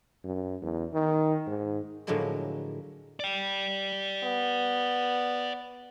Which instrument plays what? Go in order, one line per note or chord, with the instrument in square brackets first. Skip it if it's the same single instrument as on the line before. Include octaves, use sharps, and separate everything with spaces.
[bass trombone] F#2
E2
D#3
G#2
[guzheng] A2 D3 F3 F#3 G#3 A#3
[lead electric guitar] D5 G5
[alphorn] B3